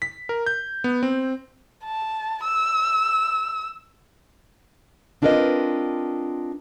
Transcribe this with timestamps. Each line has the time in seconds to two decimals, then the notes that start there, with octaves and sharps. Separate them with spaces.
0.02 B6
0.29 A#4
0.46 G6
0.84 B3
1.03 C4
1.84 A5
2.43 E6
5.22 C4 D4 F4 A#4 B4 D#5